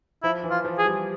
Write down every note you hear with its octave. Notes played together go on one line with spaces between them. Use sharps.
F3 E4
E3
F4
F3
G#4
G3